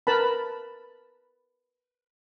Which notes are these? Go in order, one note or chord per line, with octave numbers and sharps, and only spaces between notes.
A#4 B4 A5 B5